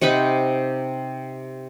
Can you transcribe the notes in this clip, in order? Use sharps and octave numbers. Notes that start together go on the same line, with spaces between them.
C3 D#4 F#5 B5